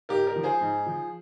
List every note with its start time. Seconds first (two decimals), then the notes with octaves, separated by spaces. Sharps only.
0.09 G#2 G4 A#4
0.27 G4 A#4
0.36 F3
0.43 G#4 C5
0.61 G#2
0.86 F3